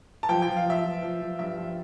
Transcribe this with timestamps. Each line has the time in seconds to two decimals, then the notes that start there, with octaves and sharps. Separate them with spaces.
0.23 A5
0.29 F3 G5
0.42 G5
0.48 F3
0.57 F5
0.65 F3 E5
0.84 F3
1.02 F3
1.21 F3
1.39 G2 E5
1.58 F3